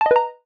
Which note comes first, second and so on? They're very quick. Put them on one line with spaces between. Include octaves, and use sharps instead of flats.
A5 D#5 B4 A#5